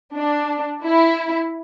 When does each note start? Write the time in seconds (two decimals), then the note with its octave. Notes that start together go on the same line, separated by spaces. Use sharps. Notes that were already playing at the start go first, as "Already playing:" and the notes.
0.14 D4
0.84 E4